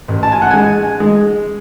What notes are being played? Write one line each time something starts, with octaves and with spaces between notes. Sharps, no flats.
A1
A5
G#5
F#5
G#3 G#5
G#3